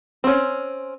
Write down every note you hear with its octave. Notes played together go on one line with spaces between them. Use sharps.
C4 C#4